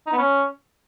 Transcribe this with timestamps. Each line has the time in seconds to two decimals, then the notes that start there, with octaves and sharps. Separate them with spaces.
0.07 D#4
0.13 B3
0.18 C#4